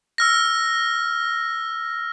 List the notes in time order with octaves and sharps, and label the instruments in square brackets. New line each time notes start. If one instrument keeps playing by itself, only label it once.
[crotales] E6 F6 A#6